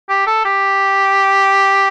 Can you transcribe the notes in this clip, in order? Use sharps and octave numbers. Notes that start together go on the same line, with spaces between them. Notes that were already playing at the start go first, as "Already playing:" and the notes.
G4
A4
G4